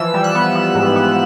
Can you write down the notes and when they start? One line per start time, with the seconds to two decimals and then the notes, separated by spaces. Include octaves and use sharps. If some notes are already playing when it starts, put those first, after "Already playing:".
Already playing: E3 F3 E6
0.14 G3
0.24 F#6
0.35 B3
0.55 B3
0.75 G#2
0.96 B3